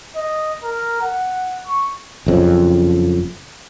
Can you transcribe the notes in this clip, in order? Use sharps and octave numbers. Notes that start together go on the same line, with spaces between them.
D#5
A#4
F#5
C#6
F#1 F2 C#3